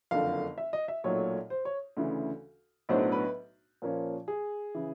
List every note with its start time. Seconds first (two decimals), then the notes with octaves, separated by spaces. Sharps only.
0.11 F#1 F2 D3 F5
0.58 E5
0.73 D#5
0.88 E5
1.04 B1 A#2 F#3 A3 C#5
1.50 C5
1.65 C#5
1.97 D2 C#3 E3
2.89 B1 A2 F#3 B3 D4 C5
3.12 B4
3.82 A#2 F3 A#3 C#4 F4
4.28 G#4
4.75 C#3 E3